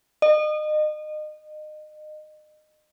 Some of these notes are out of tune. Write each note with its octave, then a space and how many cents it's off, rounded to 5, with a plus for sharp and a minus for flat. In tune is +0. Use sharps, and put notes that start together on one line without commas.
D#5 -30